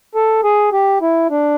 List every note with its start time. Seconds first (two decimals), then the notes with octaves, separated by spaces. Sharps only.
0.15 A4
0.44 G#4
0.73 G4
1.02 E4
1.30 D4